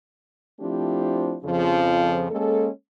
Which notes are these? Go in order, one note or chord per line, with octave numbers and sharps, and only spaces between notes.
F3 A3 C4 D4 E4 G4
F2 C#3 F3
G#3 A#3 C#4 A4